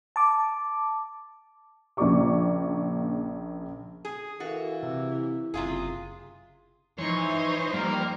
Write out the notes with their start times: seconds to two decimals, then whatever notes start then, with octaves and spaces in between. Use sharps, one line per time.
0.16 A5 D6
1.97 A#1 C#3 A#3 D5 C#6 D6
4.05 G#4
4.40 E3 F#4 A4 A#4 F5
4.83 C3 E4
5.54 F#1 C3 F4 G#4
6.99 E3 F3 D#4 C5 C#5
7.74 G3 A#3 A#4